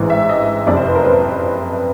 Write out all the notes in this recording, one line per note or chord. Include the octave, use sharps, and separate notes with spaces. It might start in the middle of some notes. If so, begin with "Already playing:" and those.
Already playing: A1 G#2 E3
E5
D#5
F#1 F2 C3 D5
C5
B4
A#4
B4